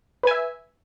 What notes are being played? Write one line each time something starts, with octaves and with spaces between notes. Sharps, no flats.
B4 E5 G#5